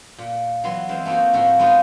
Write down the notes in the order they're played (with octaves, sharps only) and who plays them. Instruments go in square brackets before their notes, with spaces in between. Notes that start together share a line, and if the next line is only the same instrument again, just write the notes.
[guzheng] A#2
E3 F#3 B3 C6
E3 G#3 C4 F5
A3 A#3 C4 D#4 F#4
A2 F3 F#4
G3 G#3 B3 D#4 F4 F#4